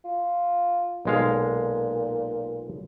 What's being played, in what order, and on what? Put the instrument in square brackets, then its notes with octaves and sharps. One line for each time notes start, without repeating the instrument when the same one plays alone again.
[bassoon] F4
[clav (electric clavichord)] B1 G#3 F5 [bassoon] A#2